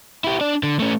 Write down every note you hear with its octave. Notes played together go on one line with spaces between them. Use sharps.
E4 G4
D4 D5
D3
A3 C#4